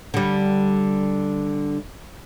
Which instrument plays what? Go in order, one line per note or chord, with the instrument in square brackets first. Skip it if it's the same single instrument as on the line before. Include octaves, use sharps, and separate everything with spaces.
[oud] D3 G3